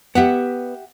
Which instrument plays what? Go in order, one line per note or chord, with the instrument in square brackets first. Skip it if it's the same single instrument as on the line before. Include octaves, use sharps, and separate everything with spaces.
[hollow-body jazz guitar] B3 [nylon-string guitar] G4 E5 F#5